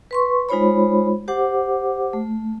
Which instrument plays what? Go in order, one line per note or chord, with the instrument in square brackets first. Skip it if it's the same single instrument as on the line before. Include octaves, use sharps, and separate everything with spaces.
[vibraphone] B4 C6 C#6
G#3 D#4 F4 C5 C#5 B5
G4 C5 F#5 D6
A3